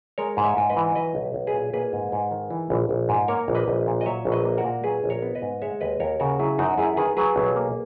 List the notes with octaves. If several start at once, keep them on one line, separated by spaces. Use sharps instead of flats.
G#3 A#4 C#5
G#2
C#5 E5
G#2
B4 D#5
E3
F#3 B4 D#5
B1
B1
G#4 B4
A#2
A#3 G#4 B4
G#2
G#2
D#3
E3
A#1
A#1
G#2
A#3 A#4 C#5
A#1
B4 D#5
A#1
A#2
D#5
F#3 C#5 E5
A#1
B4 D#5
A#3
F#4 A#4
A#2
F#3 G#4 B4
A#1
A#4 C#5
B3
B4 D#5
G#2
G#3 C#5 E5
D#2 B4 D#5
D#2 A#4 C#5
C#3 F#4 A#4
F#3 E4 G#4
F#2 D#4 F#4
F#2 E4 G#4
D#3 G#4 B4
F#3 G#4 B4
B1
A#3